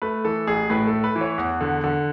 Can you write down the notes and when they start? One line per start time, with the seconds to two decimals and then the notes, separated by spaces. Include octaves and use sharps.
0.02 A3 B4
0.24 E3 A4
0.47 A1 G#4
0.70 A2 B4
0.87 A4
0.93 A3
1.04 B4
1.15 E3
1.21 C#5
1.38 E2 F#5
1.61 D3
1.84 D3